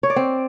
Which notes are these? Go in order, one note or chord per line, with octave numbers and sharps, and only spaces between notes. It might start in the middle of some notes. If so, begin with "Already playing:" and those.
C#5
D5
C4